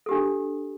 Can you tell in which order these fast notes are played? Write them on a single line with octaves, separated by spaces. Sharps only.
A4 G4 D4